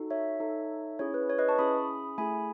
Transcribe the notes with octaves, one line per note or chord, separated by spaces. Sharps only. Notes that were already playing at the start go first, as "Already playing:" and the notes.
Already playing: D#4 F#4 A4
C#5 E5
D#4 A4
C#4 E4 G#4 C#5
B4
C#5
B4 D#5
A5 C#6
C#4 E4 G#4 B5 D#6
A3 E4 G#4 G#5 B5